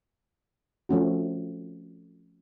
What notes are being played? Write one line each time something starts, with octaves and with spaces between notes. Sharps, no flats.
F3 A3 C#4 F#4